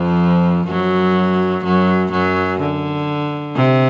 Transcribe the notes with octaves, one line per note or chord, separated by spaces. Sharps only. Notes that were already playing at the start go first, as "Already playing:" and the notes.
Already playing: F2 F3
F#2 F#3
F#2 F#3
F#2 F#3
D3
C3